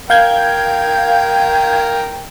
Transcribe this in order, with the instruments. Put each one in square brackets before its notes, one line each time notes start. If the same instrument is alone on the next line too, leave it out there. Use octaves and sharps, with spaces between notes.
[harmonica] A#4 G5 [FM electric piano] F5 G6 G#6